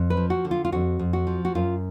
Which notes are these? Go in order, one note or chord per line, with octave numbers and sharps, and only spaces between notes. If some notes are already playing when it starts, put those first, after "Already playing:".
Already playing: F2
B4
F3
F#4
D3
F4
F4
F2 F#4
F2
F#4
F3
F#4
F#2 F4